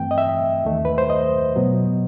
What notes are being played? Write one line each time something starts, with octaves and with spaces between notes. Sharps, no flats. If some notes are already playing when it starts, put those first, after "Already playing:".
Already playing: G2 E3 A3 C4 G5
D#5
E5
D#2 D#3 A3
B4
C5
D#5
B2 F#3 B3